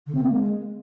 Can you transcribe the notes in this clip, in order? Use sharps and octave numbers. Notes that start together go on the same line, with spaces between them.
D3
C4
A#3
G#3